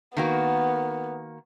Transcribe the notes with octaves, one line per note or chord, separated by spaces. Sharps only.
D#3 A#3 B3 F#4